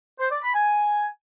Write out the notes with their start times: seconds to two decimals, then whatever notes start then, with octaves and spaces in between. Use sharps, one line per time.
0.20 C5
0.31 D5
0.43 B5
0.55 G#5